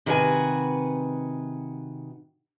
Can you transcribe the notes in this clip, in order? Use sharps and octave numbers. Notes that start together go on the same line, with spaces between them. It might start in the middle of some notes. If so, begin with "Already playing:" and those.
C3 D#3 F#4 B4 C#5 G#5